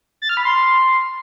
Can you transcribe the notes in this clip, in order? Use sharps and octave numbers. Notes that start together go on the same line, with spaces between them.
A6
F6
B5
C6